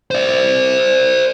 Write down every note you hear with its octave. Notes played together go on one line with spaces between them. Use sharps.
C5 D5